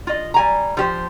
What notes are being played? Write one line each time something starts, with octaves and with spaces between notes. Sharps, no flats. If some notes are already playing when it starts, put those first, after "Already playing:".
F4 D#5
G3 G#5 A#5
F3 G4 C5